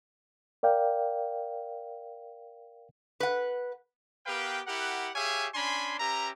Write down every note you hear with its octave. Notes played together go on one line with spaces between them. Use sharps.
A#4 D5 F5 G5
B4 F#5
B3 G4 A#4 B4 F5 G5
E4 G4 A#4 F#5
G4 G#4 C#5 E5 F5 G#5
C#4 D4 G#5 B5 C6
C#4 G4 B4 E5 A#5